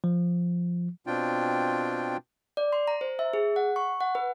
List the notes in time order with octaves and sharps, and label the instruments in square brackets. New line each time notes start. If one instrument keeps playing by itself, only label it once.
[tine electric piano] F3
[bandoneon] B2 C4 D4 F4 G5
[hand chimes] D5
C6
A#5
C5
E5
G#4
F#5
C#6
F#5
B4